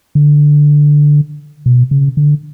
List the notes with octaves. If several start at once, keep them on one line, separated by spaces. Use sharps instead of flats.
D3
B2
C#3
D3